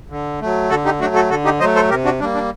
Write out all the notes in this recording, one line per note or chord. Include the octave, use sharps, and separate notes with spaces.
D3
F#3 A3
D3 F#4 A4
D#4 G4
F#3 A3 D4 F#4
F#4 A4
D3 F#4 A4
D#4 G4
F#3 A3 C5 D#5
A4 C5
C3 G4 A#4
D4 F#4
G3 A#3 D4
D4